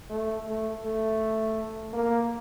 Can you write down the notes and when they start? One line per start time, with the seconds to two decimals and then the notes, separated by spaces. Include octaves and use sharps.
0.10 A3
0.47 A3
0.84 A3
1.93 A#3